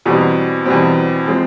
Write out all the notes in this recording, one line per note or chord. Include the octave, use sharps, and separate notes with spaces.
E2 B2 G3 C4
E2 B2 G3 C4
F3 G#3 C4